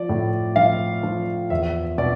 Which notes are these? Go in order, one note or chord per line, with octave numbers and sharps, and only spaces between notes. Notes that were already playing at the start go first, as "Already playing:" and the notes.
Already playing: F3 D5
A2
F3 F5
F3
E2 E5
B2 D5